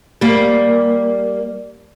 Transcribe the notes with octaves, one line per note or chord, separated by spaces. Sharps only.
G3 A#3